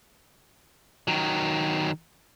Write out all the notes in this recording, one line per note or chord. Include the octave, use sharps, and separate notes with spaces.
D#3 F#3